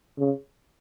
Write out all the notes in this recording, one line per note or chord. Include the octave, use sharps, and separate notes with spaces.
C#3